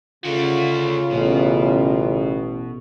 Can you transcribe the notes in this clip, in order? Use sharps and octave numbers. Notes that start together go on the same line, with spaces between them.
C#3 A3 F4 F#4
A1 B2